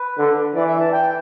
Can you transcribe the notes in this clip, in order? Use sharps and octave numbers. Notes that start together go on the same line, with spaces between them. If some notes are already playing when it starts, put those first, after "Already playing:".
Already playing: B4
D3
E3 D5
E5
A5
G5